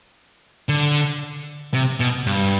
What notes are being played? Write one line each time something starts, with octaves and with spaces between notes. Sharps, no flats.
D3
C3
B2
G2